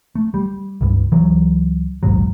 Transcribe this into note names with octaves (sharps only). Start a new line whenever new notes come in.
A3
G3
C#2 G2
C#2 E3 F#3
A#1 D#2 G#2 F#3